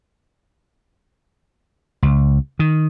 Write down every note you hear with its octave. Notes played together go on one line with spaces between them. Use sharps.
C#2
D#3